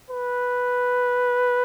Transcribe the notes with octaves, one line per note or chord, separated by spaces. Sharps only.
B4